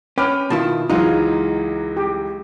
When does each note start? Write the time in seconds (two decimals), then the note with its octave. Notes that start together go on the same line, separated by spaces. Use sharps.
0.18 C#4 B4 G5 D6 F6
0.50 B2 D#3 E4 F4 A5
0.90 C#2 E3 F#3 G#3 D#4 F4
1.97 G4